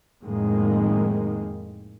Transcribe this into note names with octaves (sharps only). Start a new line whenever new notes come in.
F2 A2 D#3 G#3 A#3